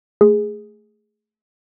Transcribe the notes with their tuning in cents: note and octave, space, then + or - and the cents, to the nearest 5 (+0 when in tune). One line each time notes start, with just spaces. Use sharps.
A3 +0 G#4 +0